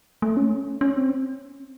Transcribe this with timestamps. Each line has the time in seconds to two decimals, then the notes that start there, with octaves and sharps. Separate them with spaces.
0.22 A3
0.37 C#4
0.81 C#4
0.97 C4